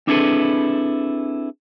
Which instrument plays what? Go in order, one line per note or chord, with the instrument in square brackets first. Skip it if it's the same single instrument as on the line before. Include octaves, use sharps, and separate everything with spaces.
[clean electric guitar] C4 D4 E4 G#4 A4 B4